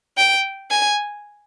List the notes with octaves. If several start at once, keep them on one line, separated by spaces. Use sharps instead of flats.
G5
G#5